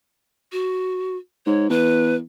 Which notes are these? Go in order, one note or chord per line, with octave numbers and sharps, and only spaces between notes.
F#4
G#2 C#5
E2 B4